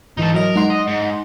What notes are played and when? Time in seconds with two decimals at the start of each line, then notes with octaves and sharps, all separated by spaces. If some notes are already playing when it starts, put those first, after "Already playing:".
0.17 G#2 E3 D#4 A4
0.34 F#3 A#4 D#5
0.56 G#3 D#4 F#5 C6
0.70 D#5
0.87 G#2